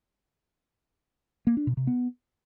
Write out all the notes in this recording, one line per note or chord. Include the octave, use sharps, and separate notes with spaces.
A#3
D4
B2
C3
B3